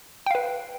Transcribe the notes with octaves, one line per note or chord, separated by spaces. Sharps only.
B4 F5 G5